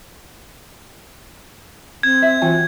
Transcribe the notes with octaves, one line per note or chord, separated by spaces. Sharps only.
C4 G#6
E5
E3 F4 F#4 G5 G#5